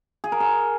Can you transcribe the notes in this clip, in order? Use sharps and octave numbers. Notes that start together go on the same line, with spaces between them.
G#4
A#4
G#4